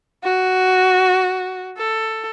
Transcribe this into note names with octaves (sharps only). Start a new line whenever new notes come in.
F#4
A4